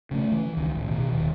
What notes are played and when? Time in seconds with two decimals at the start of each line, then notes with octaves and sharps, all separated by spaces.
0.11 C#3 G#3 A3
0.32 E3
0.56 C#2 D#3
0.76 A1
0.91 B2 D#3
1.12 D#1 D#3